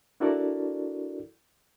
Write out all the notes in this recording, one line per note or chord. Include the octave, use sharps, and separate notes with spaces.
D4 E4 F#4 A4 A#4 D5